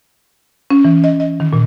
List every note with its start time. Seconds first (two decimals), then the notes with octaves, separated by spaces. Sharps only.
0.71 C#4
0.85 E3
1.04 D#5
1.20 D#5
1.40 D#3
1.53 A#2